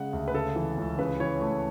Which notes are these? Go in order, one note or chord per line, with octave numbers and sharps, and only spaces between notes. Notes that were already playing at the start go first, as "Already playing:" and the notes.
Already playing: C#3 G#3 F#5
D2
B4
C#3 A4
E3
C#2
C#3 B4
E3 C#5
A3